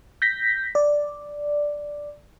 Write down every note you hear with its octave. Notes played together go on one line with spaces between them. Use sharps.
G6 A#6 B6
D5